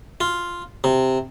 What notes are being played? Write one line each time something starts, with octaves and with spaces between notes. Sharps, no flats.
F4
C3